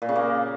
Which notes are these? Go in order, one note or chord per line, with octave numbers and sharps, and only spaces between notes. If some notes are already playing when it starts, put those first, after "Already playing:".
A#2
C#3
A#3